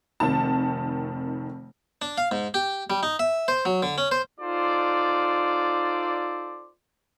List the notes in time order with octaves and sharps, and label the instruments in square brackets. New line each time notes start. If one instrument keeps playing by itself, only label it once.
[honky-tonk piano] F1 F2 D#3 A5
[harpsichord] D4
F5
G#2
G4
G3
D#4
E5
C5
F#3
D3
C#4
C5
[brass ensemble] D#4 F4 A4 C5 D5